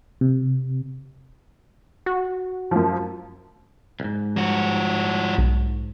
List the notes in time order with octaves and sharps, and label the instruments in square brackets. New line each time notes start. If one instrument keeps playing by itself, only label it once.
[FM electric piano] C3
[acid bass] F#4
[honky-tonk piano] F#2 F3
[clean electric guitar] C2 G#2
[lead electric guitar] F3 F#4
[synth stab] B1